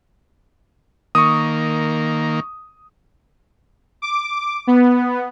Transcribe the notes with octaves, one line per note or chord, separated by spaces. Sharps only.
D#3 A#3 C#6 D#6
D6
B3